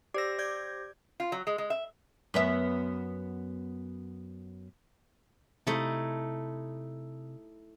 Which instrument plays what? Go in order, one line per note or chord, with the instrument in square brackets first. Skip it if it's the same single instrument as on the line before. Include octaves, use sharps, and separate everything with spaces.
[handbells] G4 C5 A#6 [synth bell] D5 E6
[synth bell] D5 G6 G#6
[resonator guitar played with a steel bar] F4
F#3
G#3
G#3
E5
[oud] F#2 B3 E5
[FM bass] C3 [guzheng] A3 D#4 E4